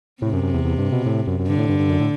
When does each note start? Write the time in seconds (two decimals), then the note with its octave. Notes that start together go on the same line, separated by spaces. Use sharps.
0.22 A2 C3
0.33 F#2
0.43 F#2
0.54 E2
0.64 E2
0.79 G2
0.92 B2
1.06 A2
1.27 F#2
1.40 F#2
1.48 G2 D3
1.58 A2
1.69 G2
1.80 G2
1.90 F#2
2.00 A2